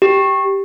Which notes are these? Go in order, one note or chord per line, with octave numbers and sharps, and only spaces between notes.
G4